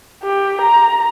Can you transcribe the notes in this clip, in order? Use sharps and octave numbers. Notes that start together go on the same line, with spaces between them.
G4
A#5